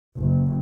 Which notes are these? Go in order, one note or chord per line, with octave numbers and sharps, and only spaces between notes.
F#1